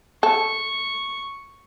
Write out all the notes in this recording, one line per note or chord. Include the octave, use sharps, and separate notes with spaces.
A4 C#6